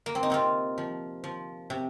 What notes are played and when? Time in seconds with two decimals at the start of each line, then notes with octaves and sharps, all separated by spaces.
0.06 A#3
0.15 C4
0.23 D#4
0.30 C3 C4 F4
0.78 F3
1.24 F3
1.70 C3